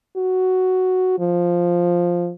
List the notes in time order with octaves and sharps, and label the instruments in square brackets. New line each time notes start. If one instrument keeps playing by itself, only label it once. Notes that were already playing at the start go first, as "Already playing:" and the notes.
[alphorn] F#4
F3